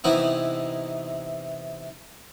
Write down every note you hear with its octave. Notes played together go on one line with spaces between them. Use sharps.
C3 E3 B3 D#4 E4